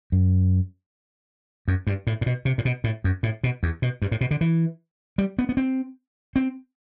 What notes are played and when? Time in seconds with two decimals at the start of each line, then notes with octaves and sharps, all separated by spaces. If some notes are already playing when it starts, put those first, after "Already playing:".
0.12 F#2
1.68 F#2
1.87 G2
2.07 A2
2.21 A2
2.26 B2
2.45 C3
2.58 A2
2.65 B2
2.84 A2
3.04 F#2
3.23 A2
3.44 B2
3.63 E2
3.82 B2
4.02 G2
4.11 A2
4.21 B2
4.31 D3
4.41 E3
5.18 G3
5.39 B3
5.49 B3
5.57 C4
6.36 C4